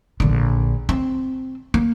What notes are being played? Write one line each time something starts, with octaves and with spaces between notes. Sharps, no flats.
A#1 D3
C4
A#3